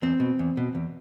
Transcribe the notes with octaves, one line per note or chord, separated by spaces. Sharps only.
E2 C4
B2
E2
B2
E2